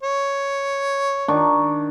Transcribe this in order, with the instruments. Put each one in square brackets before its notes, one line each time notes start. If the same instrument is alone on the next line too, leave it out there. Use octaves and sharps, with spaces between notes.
[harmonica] C#5
[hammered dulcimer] D#3 D4 C#6